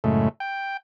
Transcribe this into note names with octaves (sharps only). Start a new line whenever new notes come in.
F#2 A2 C#3 G#3 A3
G5